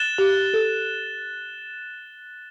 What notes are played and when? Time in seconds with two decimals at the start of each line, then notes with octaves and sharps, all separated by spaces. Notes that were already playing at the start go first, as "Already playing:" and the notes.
Already playing: F#6 A6 E7 G7
0.18 G4
0.54 A4